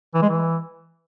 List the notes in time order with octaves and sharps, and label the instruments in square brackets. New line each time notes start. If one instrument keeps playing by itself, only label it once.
[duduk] E3
G#3
E3